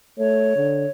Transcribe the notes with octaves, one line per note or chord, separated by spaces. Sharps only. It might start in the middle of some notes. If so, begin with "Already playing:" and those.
A3 C#5
D3